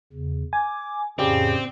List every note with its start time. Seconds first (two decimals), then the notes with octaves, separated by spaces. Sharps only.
0.13 E2 C#3
0.53 G#5 D6
1.19 F2 A2 C#3 C4 G4 G#4 D5